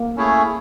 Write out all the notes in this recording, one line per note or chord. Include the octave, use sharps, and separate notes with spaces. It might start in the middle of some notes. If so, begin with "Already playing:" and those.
Already playing: A#3
A3 C#4 E4 G#4 C#5